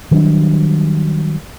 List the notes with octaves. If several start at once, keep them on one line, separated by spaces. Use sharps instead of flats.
D#3 F#3 G3 D4